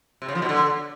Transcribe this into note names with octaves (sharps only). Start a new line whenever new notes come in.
C3
C#3
F3
B2
D3